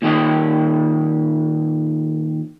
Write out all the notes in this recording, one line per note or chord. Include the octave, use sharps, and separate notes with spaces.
A#2 D#3 G4 D#5